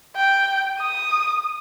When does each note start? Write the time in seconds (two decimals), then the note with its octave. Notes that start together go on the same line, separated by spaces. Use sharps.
0.17 G5
0.79 D#6